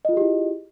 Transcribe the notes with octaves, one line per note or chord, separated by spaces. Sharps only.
E4 F4 G4 G#4 D#5